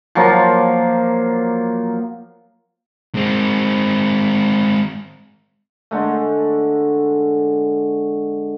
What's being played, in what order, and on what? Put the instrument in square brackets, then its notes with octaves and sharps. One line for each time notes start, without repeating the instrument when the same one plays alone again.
[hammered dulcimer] F3 F#3 A#3 F4
[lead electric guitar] G#3 C4
[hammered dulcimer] D3 G#3 A3